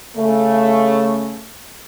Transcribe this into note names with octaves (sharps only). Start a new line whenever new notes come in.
C#3 A3